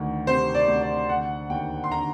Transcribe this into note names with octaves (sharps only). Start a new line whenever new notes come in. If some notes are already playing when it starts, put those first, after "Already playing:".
Already playing: D2 D#3
C3 C5
D5
D2
D5
D3 F#5
D#2 G5
C6
D3 A#5